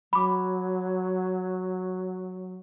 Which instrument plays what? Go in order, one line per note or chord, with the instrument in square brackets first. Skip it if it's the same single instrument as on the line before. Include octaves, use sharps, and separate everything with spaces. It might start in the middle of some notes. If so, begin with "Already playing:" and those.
[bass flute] F#3 [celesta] B5 D6